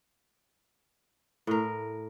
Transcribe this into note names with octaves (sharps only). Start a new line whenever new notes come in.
A2 A#4